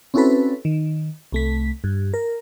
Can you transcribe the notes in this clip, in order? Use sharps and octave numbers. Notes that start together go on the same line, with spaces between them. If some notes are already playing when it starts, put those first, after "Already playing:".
C4 C#4 E4 F#4 A4 B4
D#3
C2 A3 B6
G2
A#4